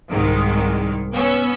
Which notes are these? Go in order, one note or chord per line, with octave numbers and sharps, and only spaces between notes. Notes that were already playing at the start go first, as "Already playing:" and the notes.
C2 G#2 D#3 G#3
B3 C#4 E6